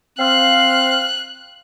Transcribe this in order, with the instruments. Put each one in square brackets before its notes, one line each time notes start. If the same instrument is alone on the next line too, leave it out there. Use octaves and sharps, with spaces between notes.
[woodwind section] C4 F5 [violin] F#6